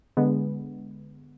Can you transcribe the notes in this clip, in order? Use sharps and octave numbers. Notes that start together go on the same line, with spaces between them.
D3 G#3 B3